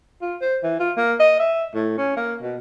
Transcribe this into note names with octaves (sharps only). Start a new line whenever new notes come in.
F4
C5
E3
F4
A#3
D#5
E5
A2
C#4
A#3
B2